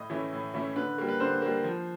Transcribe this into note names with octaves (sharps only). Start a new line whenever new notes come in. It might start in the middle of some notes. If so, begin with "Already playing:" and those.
Already playing: A2 D#5
E3 A3 C#4 E4
A2
E3 A3 C#4 E4
D3 B4
G3 A#3
B4
D3 C5
G3 A#3
F3